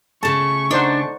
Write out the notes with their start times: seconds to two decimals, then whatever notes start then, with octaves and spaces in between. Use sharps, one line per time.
0.23 C#3 A3 A5 C#6
0.71 D4 D#4 C5 F#5